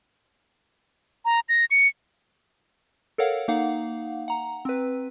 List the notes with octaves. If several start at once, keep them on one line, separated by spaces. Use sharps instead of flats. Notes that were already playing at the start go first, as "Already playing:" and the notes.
A#5
A#6
C#7
A4 A#4 C#5 F5 F#5
A#3 D#4 F5 F#5
F#5 A#5
C4 B4